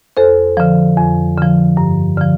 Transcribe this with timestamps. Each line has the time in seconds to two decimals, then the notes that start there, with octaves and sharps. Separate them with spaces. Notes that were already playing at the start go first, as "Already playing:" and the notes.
0.17 F2 A4 C5
0.57 D3 F3
0.97 F2
1.38 D3 F3
1.77 G2
2.18 D3 F3